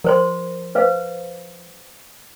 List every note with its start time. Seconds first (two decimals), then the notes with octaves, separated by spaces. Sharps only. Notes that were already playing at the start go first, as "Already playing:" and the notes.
0.04 F3 A#4 C5 C6
0.75 B4 C5 F5